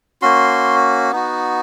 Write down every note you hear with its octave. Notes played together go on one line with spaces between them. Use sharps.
A#3 C#4 F#4 C6
B3 D#4 F#4